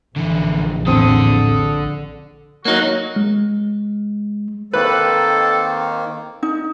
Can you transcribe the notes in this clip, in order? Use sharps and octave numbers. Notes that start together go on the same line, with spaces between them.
A#1 D3 E3
E2 A2 D3 C4 A4 D#6
F#3 A#3 D#4 F#4
G#3
D#3 A#3 C4 D#4 A4 B4 C5
D#4